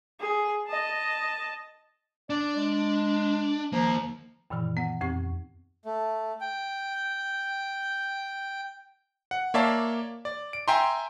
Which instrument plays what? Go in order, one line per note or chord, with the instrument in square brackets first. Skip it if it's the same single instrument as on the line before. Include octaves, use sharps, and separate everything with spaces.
[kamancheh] G#4
D#5 A5
[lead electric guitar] D4 [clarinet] D5
[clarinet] G#3
[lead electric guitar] D#2 A#3 [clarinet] F3
[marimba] F#2 A#2 D#3 E3 B5
B3 F#5
F2 C4 G4 C#6
[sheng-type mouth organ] A3
G5
[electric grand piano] F#5
A#3 C#5 D5 E5 F5 A5
D5
D7
E5 G5 G#5 A#5 C6